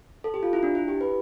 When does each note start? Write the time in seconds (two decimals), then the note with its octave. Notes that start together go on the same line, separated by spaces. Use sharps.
0.24 A4
0.34 G4
0.43 F4
0.53 E4
0.63 D4
0.75 E4
0.88 G4
1.01 B4